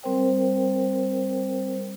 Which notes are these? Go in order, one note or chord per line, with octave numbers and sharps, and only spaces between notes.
G3 C4 A#4 C5 G5